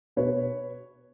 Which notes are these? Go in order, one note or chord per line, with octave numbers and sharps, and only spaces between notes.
B2 B4 C#5